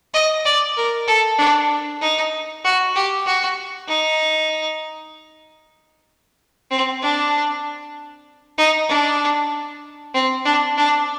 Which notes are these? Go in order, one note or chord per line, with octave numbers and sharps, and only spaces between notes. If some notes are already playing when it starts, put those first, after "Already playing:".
D#5
D5
A#4
A4
D4
D#4
F#4
G4
F#4
D#4
C4
D4
D#4
D4
C4
D4
D4